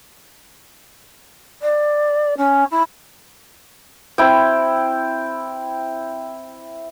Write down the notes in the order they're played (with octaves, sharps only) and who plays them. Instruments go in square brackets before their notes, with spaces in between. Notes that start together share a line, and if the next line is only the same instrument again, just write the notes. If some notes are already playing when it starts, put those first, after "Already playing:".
[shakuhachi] D5
C#4
E4
[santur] C4 E4 G5